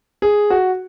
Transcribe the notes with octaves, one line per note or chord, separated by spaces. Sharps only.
G#4
F#4